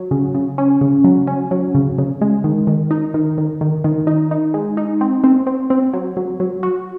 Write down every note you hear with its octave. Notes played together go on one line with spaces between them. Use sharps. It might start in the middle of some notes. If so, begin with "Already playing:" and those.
Already playing: F#3
C#3
C#3
C#4
C#3
F#3
C#4
F#3
C#3
C#3
G#3
D#3
D#3
D#4
D#3
D#3
D#3
D#3
D#4
D#4
G#3
D#4
C4
C4
C4
C4
F#3
F#3
F#3
F#4